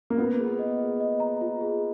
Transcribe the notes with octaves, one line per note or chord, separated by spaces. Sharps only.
A#3
B3 F4
G#4
D#5
G#4
D#5
A#5
F4
G#4